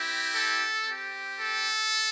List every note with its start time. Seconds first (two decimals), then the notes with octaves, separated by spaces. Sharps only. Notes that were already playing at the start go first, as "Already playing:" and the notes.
Already playing: C4 E4 G4
0.35 A4
0.87 C4 G4
1.39 A4